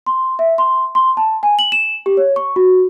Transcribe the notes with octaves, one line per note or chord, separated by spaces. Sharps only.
C6
E5
C6
C6
A5
G#5
F#7
E7
G4
C#5
C#6
F#4